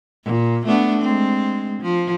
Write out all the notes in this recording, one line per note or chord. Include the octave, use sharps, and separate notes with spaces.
A#2
A3 B3 D4
G#3 C4
F3